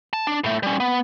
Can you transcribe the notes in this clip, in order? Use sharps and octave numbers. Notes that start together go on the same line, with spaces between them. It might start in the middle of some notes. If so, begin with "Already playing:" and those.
A5
D4
A2 A3
G3 C#4
B3